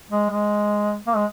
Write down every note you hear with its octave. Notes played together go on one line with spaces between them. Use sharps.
G#3
G#3
A#3
G#3